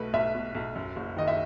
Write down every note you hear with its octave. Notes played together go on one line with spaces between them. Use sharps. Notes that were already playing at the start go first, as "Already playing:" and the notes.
Already playing: B1 B2 A3 B4
B1 E5
B2
B1
F#2
F#1
D#3 D#5
E5